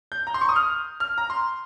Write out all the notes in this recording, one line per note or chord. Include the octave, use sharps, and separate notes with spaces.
G6
A#5
C6
C#6
D#6
F6
F6
A#5
C6